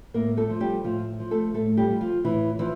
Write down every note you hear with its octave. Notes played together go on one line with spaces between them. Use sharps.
A2 A#3 A#4
A3 A4
F3
G3 G4
A2 F3 F4
F3
A3 A4
A2 A3 A4
G3 G4
F3
F3 F4
A2 E3 E4
E3 F3 E4